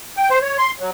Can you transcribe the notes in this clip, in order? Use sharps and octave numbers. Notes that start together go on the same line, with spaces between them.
G5
C5
C#5
C6
F#3